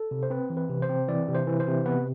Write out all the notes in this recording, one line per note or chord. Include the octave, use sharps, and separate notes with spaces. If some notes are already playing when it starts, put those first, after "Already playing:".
Already playing: A4
C3
C5
C4 B4
E3
B4
C3
C5
C4
E3 D5
C3
C5
E3
C5
C3
B3 B4